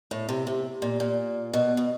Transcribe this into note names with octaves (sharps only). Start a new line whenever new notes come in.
A2
C3
C3
A#2
A#2
B2
B2